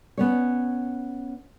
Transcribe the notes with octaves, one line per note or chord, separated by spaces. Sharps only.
B3 C#4 C#5